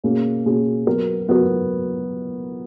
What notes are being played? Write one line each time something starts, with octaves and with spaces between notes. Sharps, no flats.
B2 A#3 C#4 G#4
B2 A#3 C#4 G#4
F#3 B3 F#4 A#4
F#3 B3 F#4 A#4